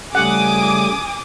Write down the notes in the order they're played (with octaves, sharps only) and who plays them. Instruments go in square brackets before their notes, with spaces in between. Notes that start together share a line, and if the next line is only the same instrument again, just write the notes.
[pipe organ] C#3 G3 A3 [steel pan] F#5 [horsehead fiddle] G#5 [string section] D6 D#6